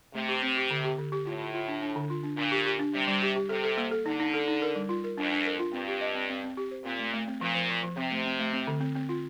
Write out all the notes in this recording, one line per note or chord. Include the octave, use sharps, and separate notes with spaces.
C3 A3
G4
C4
G4
D3
G4
D3
G4
A2 F4
F4
F4
D4
D4
D3
F4
D4
A#2 D4
G4
G4
D4
C3 G3
G3
G4
G4
C3 A4
A4
A#3
A4
D3 D#4
D#4
A4
D#4
A#4
G3
F4
A#4
F2 D4
D4
A#4
F4
G2 C4
G4
D#5
C4
C4
C4
G4
C5
A#2 C4
A3
A3
C4
A#2 F3
F3
F3
F3
C3 C4
A3
C4
A3
C4
D3
C4
C4
F4